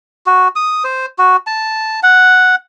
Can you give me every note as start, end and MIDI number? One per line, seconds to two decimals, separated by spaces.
0.26 0.48 66
0.56 0.83 87
0.84 1.06 72
1.19 1.36 66
1.47 2.00 81
2.03 2.55 78